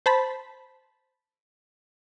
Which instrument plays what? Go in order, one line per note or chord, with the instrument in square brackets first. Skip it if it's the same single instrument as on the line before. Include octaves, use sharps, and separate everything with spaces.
[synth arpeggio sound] C5 A5 B5